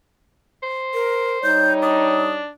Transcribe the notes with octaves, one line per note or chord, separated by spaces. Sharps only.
C5
A#4
G3 D#4 C#5 G6
D4 D#6